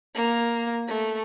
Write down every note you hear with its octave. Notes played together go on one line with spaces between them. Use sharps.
A#3
A3